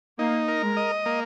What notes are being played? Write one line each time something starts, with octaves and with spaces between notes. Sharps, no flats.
A#3 D#4
A#4
G#3
D#5
A#3